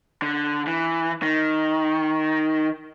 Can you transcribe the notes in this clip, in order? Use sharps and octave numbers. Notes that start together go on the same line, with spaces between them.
D3
E3
D#3